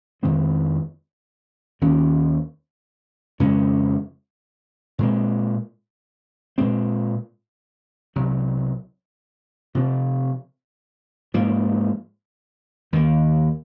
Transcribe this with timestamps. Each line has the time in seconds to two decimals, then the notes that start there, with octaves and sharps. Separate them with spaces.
0.23 F2 D#3 G#3 C4
1.81 D#2 D#3 A#3 C#4
3.40 F2 C#3 G#3 C#4
4.99 A#2 G#3 C4
6.58 A#2 G#3 C4
8.16 C2 C3 F#3
9.75 C3 F3 C4
11.34 G#2 F3 A#3
12.92 D#2 D#3 A#3